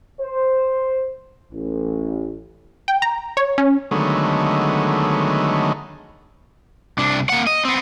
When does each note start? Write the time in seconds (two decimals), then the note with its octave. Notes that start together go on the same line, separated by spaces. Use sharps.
0.20 C5
1.53 A1
2.88 G5
3.02 A#5
3.37 C#5
3.58 C#4
3.91 D3 D#3 F#3 G#3 A3 B3
6.98 C2 D4
7.29 A#3 F#5
7.47 D#5
7.65 B3 C4